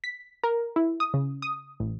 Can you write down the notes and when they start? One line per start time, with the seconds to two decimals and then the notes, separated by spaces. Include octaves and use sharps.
0.04 B6
0.44 A#4
0.76 E4
1.00 D#6
1.14 C#3
1.42 D#6
1.80 A1